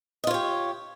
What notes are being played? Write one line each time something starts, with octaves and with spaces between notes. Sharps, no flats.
F4 G4 C#5 D#5